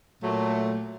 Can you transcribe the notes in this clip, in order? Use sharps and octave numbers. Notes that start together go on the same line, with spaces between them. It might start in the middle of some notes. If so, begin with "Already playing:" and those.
A#2 F#3 A3